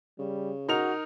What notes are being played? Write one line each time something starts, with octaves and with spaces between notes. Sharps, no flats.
C#3 G3
D#4 F#4 A#4 F7